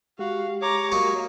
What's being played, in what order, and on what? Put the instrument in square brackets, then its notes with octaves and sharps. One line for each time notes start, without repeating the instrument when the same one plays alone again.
[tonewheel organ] G#3 G4 [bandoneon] F#4 [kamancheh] F5
[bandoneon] C#5 [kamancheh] A#5 D6
[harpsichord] F#3 D#4 C#6 [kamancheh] A#3